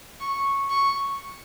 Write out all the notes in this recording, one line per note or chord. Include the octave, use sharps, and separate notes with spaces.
C#6
C#6